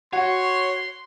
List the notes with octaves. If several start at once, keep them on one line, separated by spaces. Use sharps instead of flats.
F#4 C#5 C6